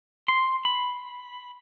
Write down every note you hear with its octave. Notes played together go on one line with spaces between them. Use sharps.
C6
B5